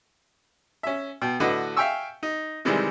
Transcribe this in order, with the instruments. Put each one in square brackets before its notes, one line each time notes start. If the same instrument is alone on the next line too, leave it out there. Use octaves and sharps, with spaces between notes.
[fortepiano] C#4 E5
B2 G5
A2 D3 F#4 B4 D#5
E5 F5 G5 G#5 C#6 E6
D#4
C3 D#3 E3 G3 G#3